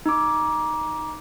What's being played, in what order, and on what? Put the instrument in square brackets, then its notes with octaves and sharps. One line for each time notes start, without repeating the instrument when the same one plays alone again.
[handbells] D#4 D6